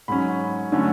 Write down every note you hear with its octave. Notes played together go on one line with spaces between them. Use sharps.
G#2 F#3 C#4 B5
D3 F#3 A3 C#4